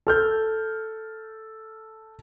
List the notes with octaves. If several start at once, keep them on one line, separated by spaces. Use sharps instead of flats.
A4 F6 G6